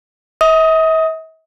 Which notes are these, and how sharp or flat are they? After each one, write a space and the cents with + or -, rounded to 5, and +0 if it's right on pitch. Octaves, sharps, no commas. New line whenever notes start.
E5 -45 D#6 +20